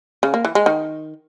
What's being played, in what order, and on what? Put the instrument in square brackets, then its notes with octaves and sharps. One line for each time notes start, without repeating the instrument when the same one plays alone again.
[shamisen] C#3
A#3
E3
G#3
D#3